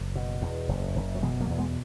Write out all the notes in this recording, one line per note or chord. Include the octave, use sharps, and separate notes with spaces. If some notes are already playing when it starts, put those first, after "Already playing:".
Already playing: F#1
B2
E2
F#1
F#1
F#3
B2 E3 G#3
F#3 A#3
E2
G#3 B3